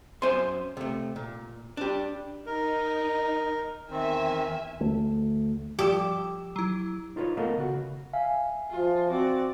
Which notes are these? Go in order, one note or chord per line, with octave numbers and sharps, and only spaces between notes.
F#2 C5 E5 G#5 C6
C3 A3
A#2
D4 G4
D#4 A#4
E2 D#3 C4 E5 G#5
D2 A3
F3 G4 E6 E7
F#3 E4
D#4 F4 G4 B4 C#5
A3 B3 A4 A#4 D#5 F5
C#3 F#4
E5 F5 G#5
F3 F4
C4 F#4 D5